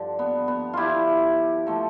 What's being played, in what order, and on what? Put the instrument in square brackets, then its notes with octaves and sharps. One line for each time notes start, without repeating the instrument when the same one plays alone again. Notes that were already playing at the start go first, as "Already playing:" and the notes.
Already playing: [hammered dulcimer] G2 D3 F3
B3
B3
E4 F4 G4
F3 A3